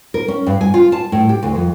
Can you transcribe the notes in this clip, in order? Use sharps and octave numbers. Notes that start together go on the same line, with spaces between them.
A#4
C#4
G2
G#5
F4
A5
A2
G4
D2
F2